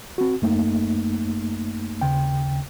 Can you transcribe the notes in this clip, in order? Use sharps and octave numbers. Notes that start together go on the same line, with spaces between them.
C4 F#4
F#2 A3 A#3 D#4
D#2 C#3 G5